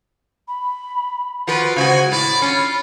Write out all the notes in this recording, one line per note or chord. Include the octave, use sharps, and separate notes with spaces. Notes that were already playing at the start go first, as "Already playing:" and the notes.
B5
F3 F4 F#4 B4
C#3 G#3 F#4 C5 G#5
A2 D5 B5
C#4 F4